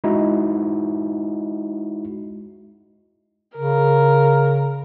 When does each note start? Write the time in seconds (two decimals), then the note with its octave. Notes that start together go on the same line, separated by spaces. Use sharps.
0.04 G#3 D#4 E4 F#4
3.57 C#3 A#4